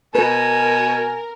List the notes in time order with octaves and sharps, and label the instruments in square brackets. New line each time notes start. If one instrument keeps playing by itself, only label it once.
[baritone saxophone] B2 [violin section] A#4 [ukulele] B4 [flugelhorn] G#5